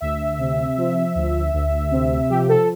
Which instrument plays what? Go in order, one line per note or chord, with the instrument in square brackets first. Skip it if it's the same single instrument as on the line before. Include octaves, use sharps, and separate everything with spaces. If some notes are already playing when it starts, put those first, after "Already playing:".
[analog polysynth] D2 E5
C3
F3
D2
D2
C3
F3 G4
A4